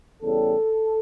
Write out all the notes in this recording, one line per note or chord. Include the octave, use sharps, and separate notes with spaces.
E2 C#3 G3 A4